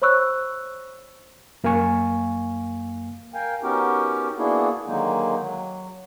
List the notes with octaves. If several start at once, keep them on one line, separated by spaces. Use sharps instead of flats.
C5 C#5 B5 C#6 E6 F#6
F#2 A#3 F5 G#5 C#6
A#4 F5 G5 G#5
B3 C#4 D#4 F#4 G4 A#4
A#3 B3 D4 E4 F#4 G#4
D3 D#3 F#3 G#3 A#3 D#4
F#3